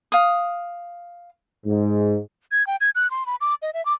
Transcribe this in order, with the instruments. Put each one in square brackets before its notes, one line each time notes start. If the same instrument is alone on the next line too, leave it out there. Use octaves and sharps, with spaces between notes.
[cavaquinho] F5 D#6
[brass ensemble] G#2
[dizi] G#6
G5
G#6
F#6
C6
B5
D6
D#5
E5
D6